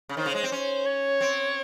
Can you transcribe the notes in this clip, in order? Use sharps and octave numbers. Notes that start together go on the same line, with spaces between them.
C#3
D#3 C5
C#3
G#3
C4
C#4
C#5
C4